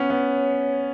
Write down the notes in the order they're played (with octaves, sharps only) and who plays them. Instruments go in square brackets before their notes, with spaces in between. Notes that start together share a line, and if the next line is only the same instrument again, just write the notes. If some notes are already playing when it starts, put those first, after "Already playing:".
Already playing: [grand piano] B3 C#4 [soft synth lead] C#5
[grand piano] B3